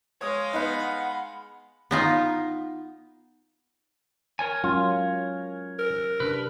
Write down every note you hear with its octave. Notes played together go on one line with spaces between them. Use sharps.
G#3 C#5 F5 D#6
B3 D#4 F#5 B5
B3 D#4 F4
A#4 C#5 G#5
F#3 G#3 C#4 F4
A#4
C3 D4 B4